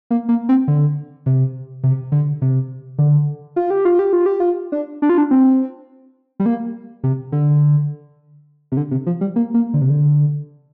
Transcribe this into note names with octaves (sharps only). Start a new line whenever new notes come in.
A#3
A#3
C4
D3
C3
C3
D3
C3
D3
F4
G4
F4
G4
F4
G4
F4
D4
D4
F4
D4
C4
G3
A#3
C3
D3
C3
D3
C3
F3
G3
A#3
A#3
D3
C3
D3